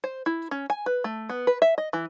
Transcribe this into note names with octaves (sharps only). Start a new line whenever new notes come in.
C5
E4
C#4
G#5
B4
A3
B3
B4
E5
D#5
E3